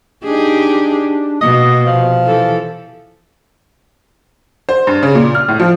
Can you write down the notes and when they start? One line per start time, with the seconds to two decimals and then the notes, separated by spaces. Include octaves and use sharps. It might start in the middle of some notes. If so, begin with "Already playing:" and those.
0.24 D4 D#4 G4 G#4
1.41 B2 A#3 D#5
1.86 C3 F3
2.26 E3 A4
4.69 C5
4.87 G2
5.03 C#3
5.15 A#2
5.35 F6
5.48 A2
5.60 F3